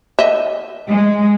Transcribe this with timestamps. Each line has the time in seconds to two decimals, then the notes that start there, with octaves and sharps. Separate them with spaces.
0.19 D#5 E5
0.90 G#3